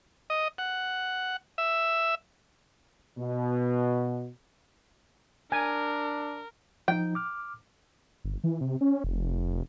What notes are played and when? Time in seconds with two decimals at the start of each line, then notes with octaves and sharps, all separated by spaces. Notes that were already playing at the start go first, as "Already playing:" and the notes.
0.30 D#5
0.58 F#5
1.58 E5
3.18 B2
5.52 D4 A#4 G#5
6.88 F3 D#4 G5
7.15 D6 F6
8.25 G1
8.44 E3
8.61 C3
8.81 C#4
9.04 F1